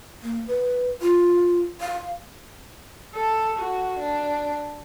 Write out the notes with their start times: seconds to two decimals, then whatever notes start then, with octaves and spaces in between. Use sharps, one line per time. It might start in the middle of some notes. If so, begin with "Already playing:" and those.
0.23 A#3
0.47 B4
1.02 F4
1.81 F5
3.15 A4
3.59 F#4
3.99 D4